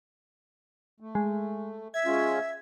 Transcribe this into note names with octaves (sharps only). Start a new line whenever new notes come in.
A3
G#3
E5 G#6
G#3 C#4 F4